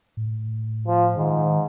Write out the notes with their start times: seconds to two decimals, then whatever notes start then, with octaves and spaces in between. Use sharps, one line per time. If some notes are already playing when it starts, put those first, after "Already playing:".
0.17 A2
0.87 F3
1.17 G#2 D#3